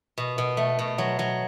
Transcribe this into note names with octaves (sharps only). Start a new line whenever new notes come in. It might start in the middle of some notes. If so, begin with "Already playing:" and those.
B2
B2
A3
B2
F#3
F#3